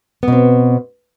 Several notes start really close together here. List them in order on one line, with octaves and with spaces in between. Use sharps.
B3 B2 C4